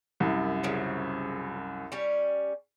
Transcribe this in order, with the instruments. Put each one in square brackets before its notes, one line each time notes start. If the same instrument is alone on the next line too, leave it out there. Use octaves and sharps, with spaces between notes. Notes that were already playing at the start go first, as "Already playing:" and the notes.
[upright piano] C2 F#2
[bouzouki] C#3 F3 F#3
G3 C#4